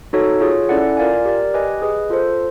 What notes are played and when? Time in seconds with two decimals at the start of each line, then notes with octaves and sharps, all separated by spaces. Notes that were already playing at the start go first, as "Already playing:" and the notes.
0.13 D#4 F#4 A4 C#5
0.41 F4 G#4 C#5
0.69 C#4 E4 A4 D5 F#5
0.97 F4 A#4 D5 F5 G#5
1.25 G4 A#4 D5
1.54 G4 B4 D#5 G#5
1.82 G#4 B4 D#5
2.10 F4 A4 C5